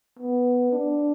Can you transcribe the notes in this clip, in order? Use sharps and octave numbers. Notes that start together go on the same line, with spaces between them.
B3
D4